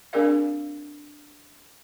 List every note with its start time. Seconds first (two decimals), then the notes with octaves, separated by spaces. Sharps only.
0.13 C4 D4 G#4 A#4 D5 F5